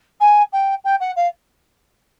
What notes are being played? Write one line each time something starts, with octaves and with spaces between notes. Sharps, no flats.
G#5
G5
G5
F#5
F5